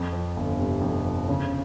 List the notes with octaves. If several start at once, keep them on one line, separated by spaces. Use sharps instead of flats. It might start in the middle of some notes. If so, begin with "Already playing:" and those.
Already playing: F2
F3
G1
C3
F2
F3
C#3